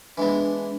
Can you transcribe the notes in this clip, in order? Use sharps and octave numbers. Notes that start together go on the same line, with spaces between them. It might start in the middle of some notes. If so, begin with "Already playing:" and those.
E3 G#3 B3 D4